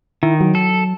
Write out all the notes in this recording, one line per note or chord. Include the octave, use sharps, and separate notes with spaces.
D#3 E4
F#3
A4